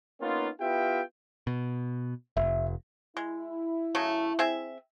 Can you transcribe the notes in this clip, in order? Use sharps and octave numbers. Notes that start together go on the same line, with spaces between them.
A#3 B3 C#4 D#4 F4
B3 E4 F4 G4 E5 G5
B2
F1 E5
G#3 E4
C#3 F#3 A3
C4 G#4 E5